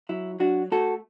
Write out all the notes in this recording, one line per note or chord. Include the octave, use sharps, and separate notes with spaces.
F#3 E4
F#3 D4 F#4
A3 F#4 A4